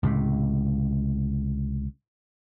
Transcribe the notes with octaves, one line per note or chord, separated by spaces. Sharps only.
C#2 A2 C3